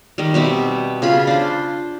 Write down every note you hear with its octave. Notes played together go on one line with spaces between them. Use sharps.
D#3 G3
B2 G3 C4 E5
C#3 F4 B5
D4 C5